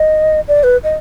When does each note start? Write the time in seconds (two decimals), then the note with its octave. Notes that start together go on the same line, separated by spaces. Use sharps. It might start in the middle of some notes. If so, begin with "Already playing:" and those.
Already playing: D#5
0.48 D5
0.63 B4
0.84 D#5